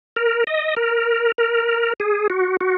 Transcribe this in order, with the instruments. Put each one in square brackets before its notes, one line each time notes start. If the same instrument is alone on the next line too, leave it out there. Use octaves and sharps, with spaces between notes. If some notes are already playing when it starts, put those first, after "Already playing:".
[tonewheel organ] A#4
D#5
A#4
A#4
G#4
F#4
F#4